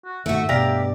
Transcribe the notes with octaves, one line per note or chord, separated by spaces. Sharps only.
F#4
G#2 D#3 A3 F#4 E5
G2 B2 G4 D5 F5 A#5